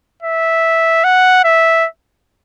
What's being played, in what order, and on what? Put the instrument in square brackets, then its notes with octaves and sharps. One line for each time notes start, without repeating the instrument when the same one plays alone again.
[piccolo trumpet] E5
F#5
E5